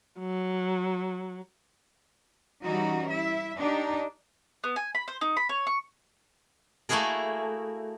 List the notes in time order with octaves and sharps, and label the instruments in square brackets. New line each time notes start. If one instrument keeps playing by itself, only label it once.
[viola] F#3
[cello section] E3 G3 C#4 D#4 F#4
E4 E5
D4 D#4 G4
[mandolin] B3
G#5
B5
C5
D#4
B5
C#5
C#6
[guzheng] A3 A#3 E4 F#4 G#4 A#4